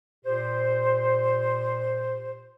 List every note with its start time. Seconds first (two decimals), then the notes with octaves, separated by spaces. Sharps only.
0.25 A#2 G4 C5